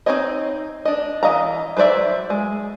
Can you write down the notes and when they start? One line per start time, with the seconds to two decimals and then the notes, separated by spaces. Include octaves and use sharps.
0.06 C4 C#4 D#4 C#5 D#5
0.85 D4 D#5
1.23 E3 D#5 F5 A#5
1.77 F#3 B4 C5 D5 E5
2.30 G#3